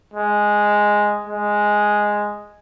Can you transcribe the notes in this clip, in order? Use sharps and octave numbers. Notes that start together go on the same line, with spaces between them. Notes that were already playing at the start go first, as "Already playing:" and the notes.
G#3
G#3